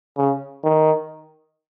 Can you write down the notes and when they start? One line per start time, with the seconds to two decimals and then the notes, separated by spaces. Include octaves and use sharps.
0.17 C#3
0.64 D#3